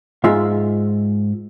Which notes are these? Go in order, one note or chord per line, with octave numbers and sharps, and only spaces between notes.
G#2 G#3 F4 E5